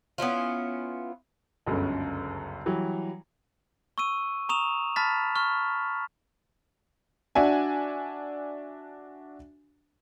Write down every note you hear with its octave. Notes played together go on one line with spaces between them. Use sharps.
B3 C#4 E4 F4
G1 C#2 F#2 C#3 C#4
E3 F#3 G3
C#6 E6 D#7
A#5 C#6 D#6 E7 F7
A5 B5 F6 A6 B6
C#6 F6
D4 F#4 E5 G#5